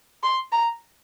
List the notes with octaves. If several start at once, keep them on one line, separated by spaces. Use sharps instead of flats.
C6
A#5